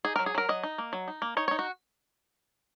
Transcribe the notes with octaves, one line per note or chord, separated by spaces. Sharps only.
D#4 G#4
F#3 A#4
G#4
F#3 A#4
F#3 D#5
D#4
A#3
F#3
D#4
A#3
D#4 C#5
D#4 C#5
F#4